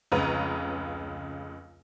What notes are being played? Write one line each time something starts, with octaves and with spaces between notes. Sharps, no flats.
F1 C#2 C#3 B4 A#5